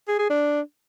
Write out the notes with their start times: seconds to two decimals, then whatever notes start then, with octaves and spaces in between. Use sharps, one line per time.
0.08 G#4
0.19 G#4
0.30 D4